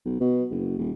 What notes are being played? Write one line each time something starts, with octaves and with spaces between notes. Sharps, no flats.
B1
B2
F#1
D#1